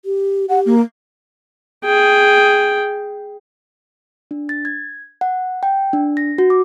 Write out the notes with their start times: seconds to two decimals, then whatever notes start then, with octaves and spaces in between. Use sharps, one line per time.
0.05 G4
0.49 G4 F#5
0.66 A#3
1.85 G#4 G5
4.31 D4
4.49 A6
4.65 G#6
5.21 F#5
5.63 G5
5.93 D4
6.17 A#6
6.38 F#4
6.50 D6